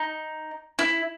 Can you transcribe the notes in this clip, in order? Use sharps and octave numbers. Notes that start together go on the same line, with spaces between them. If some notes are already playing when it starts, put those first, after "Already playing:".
Already playing: D#4
E4